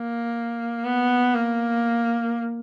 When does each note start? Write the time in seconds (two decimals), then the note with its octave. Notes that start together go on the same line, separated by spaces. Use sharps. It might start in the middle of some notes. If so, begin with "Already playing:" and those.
Already playing: A#3
0.84 B3
1.35 A#3